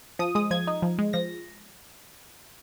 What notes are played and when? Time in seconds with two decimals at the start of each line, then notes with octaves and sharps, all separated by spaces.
0.19 F3 D#6
0.35 G#3 D#6
0.51 F3 G#6
0.67 D#4
0.82 F3
0.99 G#3
1.13 F3 A#6